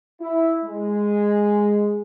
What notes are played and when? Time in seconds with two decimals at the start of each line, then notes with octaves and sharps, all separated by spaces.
0.21 E4
0.65 G#3